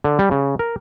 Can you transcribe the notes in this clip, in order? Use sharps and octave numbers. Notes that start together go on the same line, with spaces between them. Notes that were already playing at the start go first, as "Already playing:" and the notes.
D3
G3
C#3
A#4